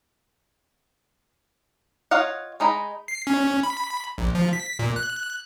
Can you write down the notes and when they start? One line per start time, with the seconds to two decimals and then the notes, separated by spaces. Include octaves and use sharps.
2.11 F4 C#5 D#5 F5 F#5
2.60 G#3 D#4 D#5 B5
3.08 C7
3.27 C#4
3.63 B5
4.18 A#1
4.35 F3
4.53 B6
4.79 A#2
4.96 F#6